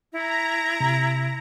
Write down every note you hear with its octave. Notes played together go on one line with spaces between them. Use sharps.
E4 A#5
C3